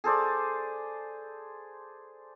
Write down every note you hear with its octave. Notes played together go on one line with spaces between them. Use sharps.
G#4 A4 C5 D5